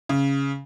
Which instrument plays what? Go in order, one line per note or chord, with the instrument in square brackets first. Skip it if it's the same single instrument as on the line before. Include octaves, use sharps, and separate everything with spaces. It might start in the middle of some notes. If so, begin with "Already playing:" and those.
[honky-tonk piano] C#3